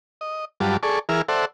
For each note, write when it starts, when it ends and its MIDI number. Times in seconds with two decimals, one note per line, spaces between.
0.21 0.45 75
0.60 0.77 43
0.60 0.77 54
0.60 0.77 55
0.60 0.77 65
0.60 0.77 81
0.60 0.77 86
0.83 0.99 68
0.83 0.99 69
0.83 0.99 74
0.83 0.99 85
1.09 1.22 52
1.09 1.22 64
1.09 1.22 68
1.09 1.22 70
1.09 1.22 89
1.28 1.45 69
1.28 1.45 72
1.28 1.45 74
1.28 1.45 76
1.28 1.45 78